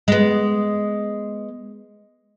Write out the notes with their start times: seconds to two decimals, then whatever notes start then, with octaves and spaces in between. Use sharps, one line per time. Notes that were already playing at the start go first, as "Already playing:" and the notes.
0.08 G#3 B3